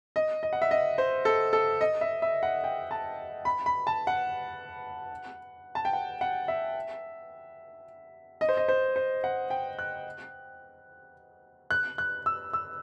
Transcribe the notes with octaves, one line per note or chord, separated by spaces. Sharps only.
D#5
D#5
F#5
E5
D#5
C5
A4
A4
D#5
E5
E5
F#5
G5
A5
B5
B5
A5
F#5
A5
G5
F#5
F#5
E5
D#5
C5
D#5
C5
C5
F#5
G5
F#6
F#6
F#6
E6
E6